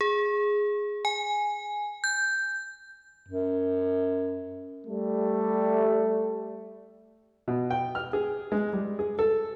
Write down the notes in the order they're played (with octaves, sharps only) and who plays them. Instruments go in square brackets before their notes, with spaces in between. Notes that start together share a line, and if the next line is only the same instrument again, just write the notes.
[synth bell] G#4
G#5
G6
[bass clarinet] F#2
[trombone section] G3 A3
[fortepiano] B2
G5
F6
G#4
G#3
G3
G#4
A4